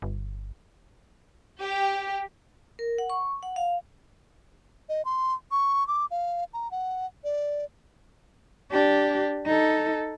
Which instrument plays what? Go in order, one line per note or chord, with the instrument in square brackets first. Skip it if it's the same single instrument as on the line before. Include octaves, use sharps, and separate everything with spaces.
[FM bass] G1
[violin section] G4
[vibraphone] A#4
F#5
C#6
F#5
F5
[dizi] D#5
C6
C#6
D6
F5
A#5
F#5
D5
[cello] D4 G4
D#4 A4